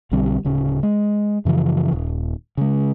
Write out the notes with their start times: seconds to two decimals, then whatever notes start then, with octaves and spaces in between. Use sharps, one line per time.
0.12 B1 D3 G3 C4
0.45 D1 C#3 C#4
0.83 G#3
1.45 F#2 C#3 E3 F3
1.93 D#1
2.57 C#3 G#3